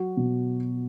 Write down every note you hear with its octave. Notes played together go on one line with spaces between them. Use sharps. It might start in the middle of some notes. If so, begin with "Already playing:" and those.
Already playing: F#3 F#4
B2